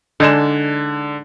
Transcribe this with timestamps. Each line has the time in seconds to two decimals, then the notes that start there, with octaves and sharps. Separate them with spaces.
0.20 D3 G#3 D4 D#4 G#6 E7